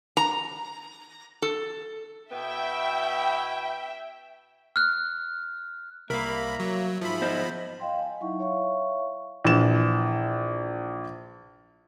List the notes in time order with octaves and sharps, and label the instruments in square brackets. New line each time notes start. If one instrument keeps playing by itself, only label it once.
[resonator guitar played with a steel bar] A#5
A4
[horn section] B2 B3 E4 [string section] E5 G5
[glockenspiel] F6 F#6
[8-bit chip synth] C2 B5 [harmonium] A#3 E5 A#5 [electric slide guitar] A#4 F5
[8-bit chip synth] F#3
[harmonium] G#2 E5 [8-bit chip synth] F3 B5
[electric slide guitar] B3 C5 D#5
[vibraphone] D#5 F5 G5 C6
G#5
F#3 D#4 E4 E5 F#5 C#6
C#5 E5 F5 C#6
[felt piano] A#1 E3 E7